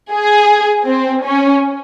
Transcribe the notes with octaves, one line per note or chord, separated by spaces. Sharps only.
G#4
C4
C#4